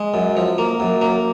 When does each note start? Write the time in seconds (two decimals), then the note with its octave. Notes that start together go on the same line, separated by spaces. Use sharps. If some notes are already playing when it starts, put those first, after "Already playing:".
Already playing: G#3
0.14 F#2
0.36 F3
0.58 A#3
0.80 F#2
1.01 A#3